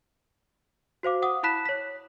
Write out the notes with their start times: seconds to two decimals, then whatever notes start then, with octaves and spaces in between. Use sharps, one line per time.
1.03 F#4 C5 F5 D6
1.22 F#5 D6 D#6
1.43 E4 A5 B5 F#6 B6 E7
1.65 C#5 B6